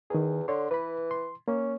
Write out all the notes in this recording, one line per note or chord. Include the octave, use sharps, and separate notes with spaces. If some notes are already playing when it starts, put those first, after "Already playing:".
E2 D#3 G#4
D3 C#5 C6
E3 B4 B5
C6
A#3 C#4